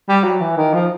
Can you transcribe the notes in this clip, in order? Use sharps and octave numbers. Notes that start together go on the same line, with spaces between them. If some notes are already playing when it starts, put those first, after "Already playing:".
G3
F#3
E3
D#3
F3